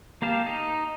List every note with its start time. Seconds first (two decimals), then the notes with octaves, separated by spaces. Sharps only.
0.22 A#3 G4 F5 A5
0.46 D#4